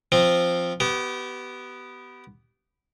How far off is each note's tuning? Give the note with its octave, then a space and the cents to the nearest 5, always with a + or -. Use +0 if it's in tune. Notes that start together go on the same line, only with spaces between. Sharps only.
F3 +0 C4 +0
B3 +5 G4 -25